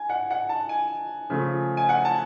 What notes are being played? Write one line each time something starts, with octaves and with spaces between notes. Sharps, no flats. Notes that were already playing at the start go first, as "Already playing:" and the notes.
Already playing: G#5
F#5
F#5
A5
G#5
C#3 F3 A3 F4
G#5
F#5
A5